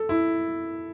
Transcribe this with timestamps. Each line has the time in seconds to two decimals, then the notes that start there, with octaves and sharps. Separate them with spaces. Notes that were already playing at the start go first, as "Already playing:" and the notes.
Already playing: A4
0.09 E4